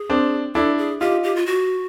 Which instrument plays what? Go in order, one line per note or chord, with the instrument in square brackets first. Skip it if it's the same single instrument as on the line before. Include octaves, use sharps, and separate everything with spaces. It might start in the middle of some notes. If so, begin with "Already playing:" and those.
Already playing: [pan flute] G#4
[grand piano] C4 D4
[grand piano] D4 E4 [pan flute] A4
[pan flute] G#4
[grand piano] D#4 F4 [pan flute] G4
[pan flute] G4
F4
F#4